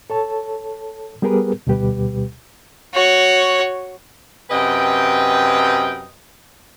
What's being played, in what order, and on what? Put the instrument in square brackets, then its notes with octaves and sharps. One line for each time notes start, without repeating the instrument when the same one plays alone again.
[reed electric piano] A4 C#5 A5
G3 B3 G4 G#4 A#4 B4
D2 B2 G3 G4 B4
[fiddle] F#4 C#5
[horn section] F#2 C3 B4 D#5 G5